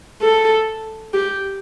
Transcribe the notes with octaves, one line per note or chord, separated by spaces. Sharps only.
A4
G4